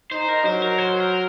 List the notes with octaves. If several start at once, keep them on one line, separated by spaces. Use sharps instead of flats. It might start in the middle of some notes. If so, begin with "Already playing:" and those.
D#4 C5
A#4
F#3 C5
A#4
C5
A#4